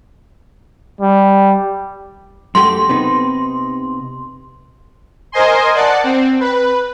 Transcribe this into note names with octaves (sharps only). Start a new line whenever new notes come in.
G3
F#2 A3 G4 C6
C3 B3 D#4
A#4 C5 D#5 G#5 C6
D5 F#5 A5
C4
B4